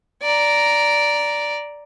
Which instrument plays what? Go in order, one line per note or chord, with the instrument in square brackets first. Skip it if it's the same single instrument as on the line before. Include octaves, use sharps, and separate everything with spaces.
[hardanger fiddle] D5 A#5